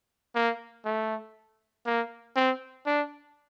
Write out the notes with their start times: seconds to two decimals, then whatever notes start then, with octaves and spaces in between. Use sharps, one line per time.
0.35 A#3
0.85 A3
1.86 A#3
2.36 C4
2.86 D4